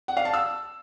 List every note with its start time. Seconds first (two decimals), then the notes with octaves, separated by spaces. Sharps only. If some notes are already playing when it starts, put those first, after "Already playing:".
0.08 F#5
0.17 F5
0.25 A5
0.34 E6